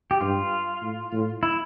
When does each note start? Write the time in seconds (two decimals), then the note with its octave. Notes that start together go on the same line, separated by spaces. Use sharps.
0.11 G4
0.21 G2 F4
0.82 A2
1.13 A2
1.43 E4